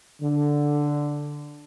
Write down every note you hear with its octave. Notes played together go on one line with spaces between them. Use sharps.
D3